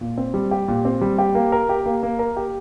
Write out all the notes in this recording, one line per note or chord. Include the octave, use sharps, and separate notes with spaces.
A#2
C4
G3
G4
A#2
C4
G3
G4
A#3
A#4
G4
A#3
A#3
A#4
G4